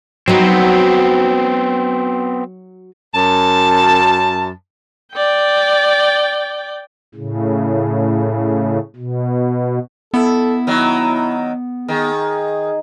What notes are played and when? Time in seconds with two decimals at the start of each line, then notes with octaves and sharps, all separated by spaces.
0.28 F#3 B3 C4 D#4
3.15 F#2 A5
5.14 D5 G5
7.15 A2 C#3
8.96 B2
10.14 B3 E4 A4
10.67 D#3 F#3 E4
11.88 D#3 G#4